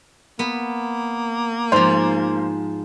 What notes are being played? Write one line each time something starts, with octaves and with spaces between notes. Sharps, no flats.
A#3 B3
G#2 F3 C5